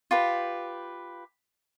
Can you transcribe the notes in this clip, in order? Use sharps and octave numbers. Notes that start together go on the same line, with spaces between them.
F4 G4 B4